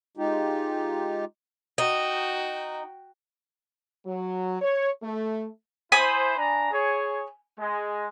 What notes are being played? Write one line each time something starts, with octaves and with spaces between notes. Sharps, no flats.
G#3 D#4 F4 G4
D#4 F#4 G5
F#3
C#5
A3
E4 C5 G#5 B5 D#6
D4 A#5
G#4 C#5
G#3